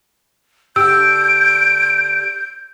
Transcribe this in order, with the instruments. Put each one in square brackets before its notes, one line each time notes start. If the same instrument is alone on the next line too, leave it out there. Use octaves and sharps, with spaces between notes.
[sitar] D3 G4 [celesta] E6 [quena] G6 [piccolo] D7